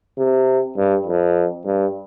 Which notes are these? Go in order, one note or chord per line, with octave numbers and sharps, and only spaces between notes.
C3
G2
F2
G2